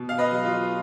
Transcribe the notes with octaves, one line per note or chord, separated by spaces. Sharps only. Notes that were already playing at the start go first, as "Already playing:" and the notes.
Already playing: B2
F5
B4 D#5
F#3
F4